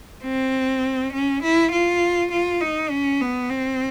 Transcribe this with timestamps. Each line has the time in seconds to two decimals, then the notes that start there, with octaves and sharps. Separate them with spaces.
0.24 C4
1.13 C#4
1.42 E4
1.72 F4
2.31 F4
2.61 D#4
2.91 C#4
3.21 B3
3.49 C4